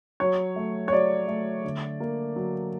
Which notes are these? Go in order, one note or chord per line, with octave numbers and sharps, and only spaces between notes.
F#3 C#5
A3
C#5
F#3 D5
A3
D3
A#3
F#3